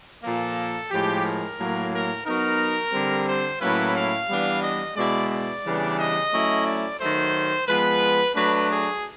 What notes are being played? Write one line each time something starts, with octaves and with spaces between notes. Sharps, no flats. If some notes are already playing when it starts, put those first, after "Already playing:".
A#2 F3 A#3 A4
A2 F3 G#3 G4
A#4
A2 F#3 A#3
A#4
F#3 B3 D#4 A#4
D3 G3 C4
C5
A2 F#3 A#3 C#4 E4 B4
F5
E3 G3 B3 D4
D#5
B2 G#3 B3 E4 D5
D5
C#3 E3 G3 B3 D4
D#5
F#3 A3 C#4 E4
D5
D#3 F#3 A3 C5
F3 G#3 B3 B4
F#3 A3 D4 B4
G#4